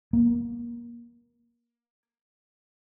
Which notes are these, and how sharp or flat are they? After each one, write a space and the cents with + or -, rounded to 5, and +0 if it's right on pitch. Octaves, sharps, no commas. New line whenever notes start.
A#3 +25